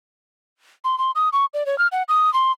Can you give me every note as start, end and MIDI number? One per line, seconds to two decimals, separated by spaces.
0.84 0.98 84
0.98 1.11 84
1.15 1.29 87
1.33 1.45 85
1.54 1.66 74
1.66 1.78 73
1.78 1.87 89
1.92 2.03 78
2.09 2.32 87
2.34 2.52 84